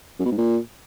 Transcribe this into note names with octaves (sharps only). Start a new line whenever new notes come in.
F#2
B2
G#2
A#2